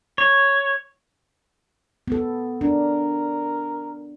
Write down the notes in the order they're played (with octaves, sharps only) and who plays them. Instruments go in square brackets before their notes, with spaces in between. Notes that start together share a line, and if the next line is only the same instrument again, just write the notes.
[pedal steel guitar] C#5
[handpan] B3 A4
[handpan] D4 [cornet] A#4